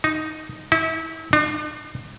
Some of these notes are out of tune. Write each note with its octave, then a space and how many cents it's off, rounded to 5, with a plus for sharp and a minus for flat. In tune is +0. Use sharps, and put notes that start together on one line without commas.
D#4 +0
E4 -35
D4 +45